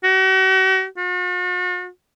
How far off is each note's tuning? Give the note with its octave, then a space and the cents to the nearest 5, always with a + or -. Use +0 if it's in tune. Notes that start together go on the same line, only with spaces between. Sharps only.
F#4 +40
F#4 -45